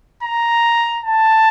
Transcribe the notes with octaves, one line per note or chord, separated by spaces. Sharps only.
A#5
A5